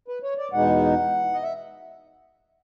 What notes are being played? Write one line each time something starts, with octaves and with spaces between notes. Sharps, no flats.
B4
C#5
D5
E2 B2 G#3 B3 D#4 F#5
D#5
E5